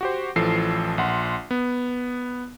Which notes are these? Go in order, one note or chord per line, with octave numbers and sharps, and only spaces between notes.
F#4 G4 C5
A1 E3 F3 A4 C7
A#1 F#5 C6
B3